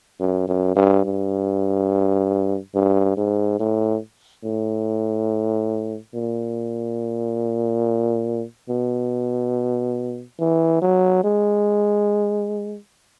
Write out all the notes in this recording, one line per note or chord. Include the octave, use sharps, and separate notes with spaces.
F#2
F#2
G2
G2
G2
G#2
A2
A2
A#2
B2
E3
F#3
G#3